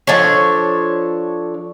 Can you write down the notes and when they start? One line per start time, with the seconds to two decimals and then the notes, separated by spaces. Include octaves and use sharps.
0.07 F3 D4 A4 C#5